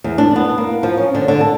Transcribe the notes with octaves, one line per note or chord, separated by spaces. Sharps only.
E2
D4
B3
A#3
F3
C#4
D3
D3
A5